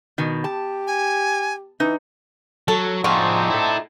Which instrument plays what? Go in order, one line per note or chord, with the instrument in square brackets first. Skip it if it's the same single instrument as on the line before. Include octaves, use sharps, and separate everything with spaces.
[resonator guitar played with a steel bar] B2 D#3
[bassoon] G4 [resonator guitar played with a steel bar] A5
[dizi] G#5
[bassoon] E3 [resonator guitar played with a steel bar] D#4
[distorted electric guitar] F#3 [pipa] A4
[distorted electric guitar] F3 G#4 [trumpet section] C4 D4 D#4 [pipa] F4 F#4
[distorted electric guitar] E4 A4